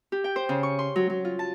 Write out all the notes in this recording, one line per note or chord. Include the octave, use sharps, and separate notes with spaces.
G4
G5
C5
C#3
C#6
C6
F#3
F#3
F4
A5